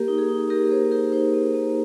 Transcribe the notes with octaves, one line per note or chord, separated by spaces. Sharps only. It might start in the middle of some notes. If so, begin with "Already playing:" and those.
Already playing: A#3 G4 A#4
D#4
G#4
D#4
A#3 G4 A#4
A#4
A#3 G#4 C5
D#4 G4 A#4
D#4 G#4 C5
A#3
A#3